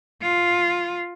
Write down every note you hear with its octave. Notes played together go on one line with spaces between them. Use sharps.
F4